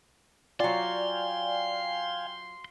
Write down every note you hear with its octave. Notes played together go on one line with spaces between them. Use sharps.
F#3 F4 D5 F5 G5 G#5 C6